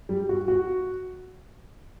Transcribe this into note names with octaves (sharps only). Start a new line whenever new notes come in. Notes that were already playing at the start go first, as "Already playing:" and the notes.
G3
F#4
F#4